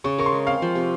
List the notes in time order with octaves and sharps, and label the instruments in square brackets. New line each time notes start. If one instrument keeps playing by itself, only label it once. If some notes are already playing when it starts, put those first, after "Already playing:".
[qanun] C#3 [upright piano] C#6
[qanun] A#4 [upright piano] C#6
[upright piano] C6
[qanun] G#3
[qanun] C4 [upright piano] F5
[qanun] F3
C3